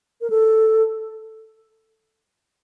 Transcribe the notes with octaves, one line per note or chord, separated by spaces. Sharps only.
A#4
A4